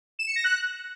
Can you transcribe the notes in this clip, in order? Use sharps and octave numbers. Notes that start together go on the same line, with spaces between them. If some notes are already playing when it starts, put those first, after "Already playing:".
E7
C#7
A#6
F#6